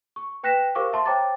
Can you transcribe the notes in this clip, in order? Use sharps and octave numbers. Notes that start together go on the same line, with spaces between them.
C#6
B4 G5 F#6 A#6 B6 E7
G4 A#4 C5 F5 C#6 D6
E5 A5 C6
C5 C#5 G5 A#5 D6 A6